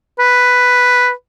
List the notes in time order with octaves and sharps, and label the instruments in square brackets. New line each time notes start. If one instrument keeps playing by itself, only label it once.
[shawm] B4